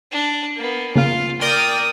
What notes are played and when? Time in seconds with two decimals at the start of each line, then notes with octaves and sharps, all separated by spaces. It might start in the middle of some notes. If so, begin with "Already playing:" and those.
0.12 D4
0.56 A#3 B3
0.96 C#3 A#3 F4 F5
1.41 A#4 D5 G5 D#6